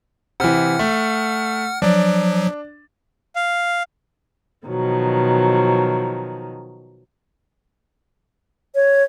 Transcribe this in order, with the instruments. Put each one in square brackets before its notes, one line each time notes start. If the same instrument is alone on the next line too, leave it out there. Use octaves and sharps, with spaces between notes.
[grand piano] C3 E3 [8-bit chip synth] F#5 F6
[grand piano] A3
[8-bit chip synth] F3 F#3 [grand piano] D4
[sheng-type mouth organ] F5
[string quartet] B2 D#3 F3 F#3
[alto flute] C#5